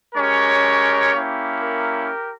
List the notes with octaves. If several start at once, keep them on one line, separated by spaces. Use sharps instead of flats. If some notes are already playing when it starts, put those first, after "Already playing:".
G#3 C#4 G4 A#4 C#5
A#3 C#4 E4 G4
G4 A#4